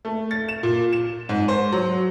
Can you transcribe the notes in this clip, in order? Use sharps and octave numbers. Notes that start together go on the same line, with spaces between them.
A3
A6
E7
A#2
E7
G#2
C5
F#3